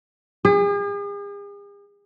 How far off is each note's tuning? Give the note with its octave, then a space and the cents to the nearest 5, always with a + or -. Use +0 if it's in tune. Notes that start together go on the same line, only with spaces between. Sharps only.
G#4 -45